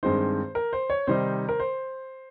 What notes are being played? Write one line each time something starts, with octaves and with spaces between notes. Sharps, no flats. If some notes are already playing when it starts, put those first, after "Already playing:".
G2 D#3 G#3 C4 D#4 C5
A#4
C5
C#5
C3 D#3 G3 C4 D#4 C5
A#4
C5